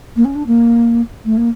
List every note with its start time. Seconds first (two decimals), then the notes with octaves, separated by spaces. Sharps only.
0.16 A#3
0.25 C#4
0.35 D4
0.47 A#3
1.25 A3
1.37 A#3